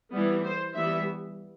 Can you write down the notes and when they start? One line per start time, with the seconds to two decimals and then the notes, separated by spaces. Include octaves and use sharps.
0.12 E3 G3 B3
0.43 C5
0.75 E3 G3 B3 E5